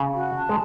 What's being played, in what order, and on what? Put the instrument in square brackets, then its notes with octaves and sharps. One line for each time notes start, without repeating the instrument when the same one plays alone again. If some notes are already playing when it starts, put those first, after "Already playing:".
Already playing: [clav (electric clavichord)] C#3
[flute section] F#4
A5
[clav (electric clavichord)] G#3